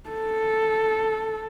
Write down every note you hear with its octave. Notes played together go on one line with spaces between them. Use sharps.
A4